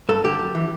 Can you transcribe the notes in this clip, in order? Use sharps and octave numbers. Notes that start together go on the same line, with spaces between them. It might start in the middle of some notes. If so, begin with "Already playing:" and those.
G2 A4
D3 G4
F#2
E3